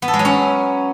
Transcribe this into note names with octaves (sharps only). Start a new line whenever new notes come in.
B3
A4
G#3
F#3
C#4